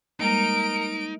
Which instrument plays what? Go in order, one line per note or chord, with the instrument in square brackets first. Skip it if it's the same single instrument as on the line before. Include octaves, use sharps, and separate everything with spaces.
[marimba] G3 G#3 A#3 [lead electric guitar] D#4 [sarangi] A#4 [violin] D7